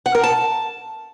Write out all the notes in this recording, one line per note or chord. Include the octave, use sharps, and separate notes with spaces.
F#5
A#4
A5